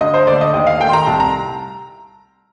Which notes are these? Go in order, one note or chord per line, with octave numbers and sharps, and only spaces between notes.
D2 D#5
C5
D3 A3 D5
D#5
D#2 D#5
F5
D#3 A3 G5
C6
A#5
C2 A5
A#5